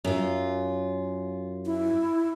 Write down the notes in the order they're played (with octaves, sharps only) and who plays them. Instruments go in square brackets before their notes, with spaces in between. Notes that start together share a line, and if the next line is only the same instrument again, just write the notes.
[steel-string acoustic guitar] F#2 F4
[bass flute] E4